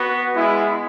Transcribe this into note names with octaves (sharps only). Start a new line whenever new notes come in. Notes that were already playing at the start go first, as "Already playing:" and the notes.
Already playing: B3 F#4
G#3 B3 E4